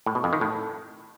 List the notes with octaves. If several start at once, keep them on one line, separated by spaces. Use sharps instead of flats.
A2
B2
F2
D#3
A2